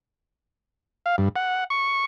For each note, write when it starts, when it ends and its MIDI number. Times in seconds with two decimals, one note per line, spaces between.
1.06 1.16 77
1.18 1.29 43
1.36 1.64 78
1.70 2.05 85